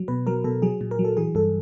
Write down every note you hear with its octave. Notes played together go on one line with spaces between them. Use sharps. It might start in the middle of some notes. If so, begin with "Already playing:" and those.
Already playing: F#3
B2 B4
F#3 A#4
B2 A4
F#3 G#4
A#2
A#4
F#3
A4
E3 G#4
G2 A4